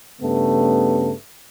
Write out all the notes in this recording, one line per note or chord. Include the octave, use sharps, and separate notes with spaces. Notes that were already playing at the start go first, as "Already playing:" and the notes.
G2 C#3 A3 B3